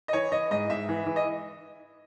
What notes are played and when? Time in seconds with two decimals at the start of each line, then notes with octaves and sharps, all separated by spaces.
0.08 D#5
0.13 E3 C#5
0.32 E3 D#5
0.51 G#2 D#5
0.70 G#2 E5
0.88 E3
1.06 E3
1.16 D#5